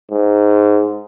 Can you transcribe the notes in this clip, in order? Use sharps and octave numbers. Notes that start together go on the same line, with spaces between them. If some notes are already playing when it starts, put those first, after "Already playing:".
G#2